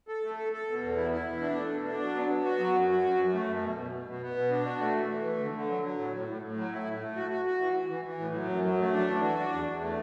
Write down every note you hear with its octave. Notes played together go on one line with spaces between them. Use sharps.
A4
A3
A4
A4
B2
E2
E4
E4
B2
D4
A3
B2
D4
F#3
B3
B3
F#4
F#3
F#2
F#4
F#3
F#2
A3
F#2
B2
B2
B2
B2
B3
B2
D4
F#4
A3
E3
E3
A3
D3
D3
F#3
F#3
A2
A2
A2
A2
F#3
E4
A2
A3
F#4
F#4
F#4
E3
E3
E3
E3
A2
F#3
F#2
F#3
A3
D4
E3
F#4
D4
E2
E2
A3